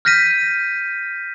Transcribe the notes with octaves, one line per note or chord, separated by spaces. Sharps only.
F6 G6 A#6 B6 D#7